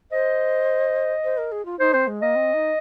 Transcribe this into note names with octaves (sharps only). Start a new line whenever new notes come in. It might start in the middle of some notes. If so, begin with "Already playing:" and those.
C5 D#5
C5
A#4
G#4
F4
D#4 C5
C4 C5
G#3
A#3 D#5
C4
D#4